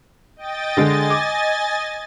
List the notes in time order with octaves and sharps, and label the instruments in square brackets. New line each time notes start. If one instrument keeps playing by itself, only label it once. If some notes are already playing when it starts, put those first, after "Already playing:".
[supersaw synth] D#5 G5 A6
[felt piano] D3 G#3 [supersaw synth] D#5 G#5 A6
[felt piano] D6